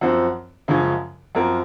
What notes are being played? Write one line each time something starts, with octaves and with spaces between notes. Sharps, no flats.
F#2 F3 C4 F#4
F#2 C#3 F3 G#3 C#4
F#2 F3 C4 F#4 A#4